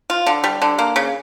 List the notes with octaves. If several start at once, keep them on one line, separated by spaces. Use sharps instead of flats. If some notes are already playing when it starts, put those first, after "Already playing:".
F4
D3
G3
D3
A#3
C#3